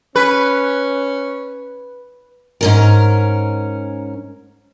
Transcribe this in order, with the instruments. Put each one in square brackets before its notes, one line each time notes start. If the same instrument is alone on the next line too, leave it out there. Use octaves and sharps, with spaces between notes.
[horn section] C#4 [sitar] B4
[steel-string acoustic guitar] G#2 C#4 A#4